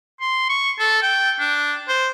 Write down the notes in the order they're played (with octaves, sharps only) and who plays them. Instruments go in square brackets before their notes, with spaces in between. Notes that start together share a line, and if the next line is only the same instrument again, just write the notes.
[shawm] C6
C#6
A4
G5
D4
C5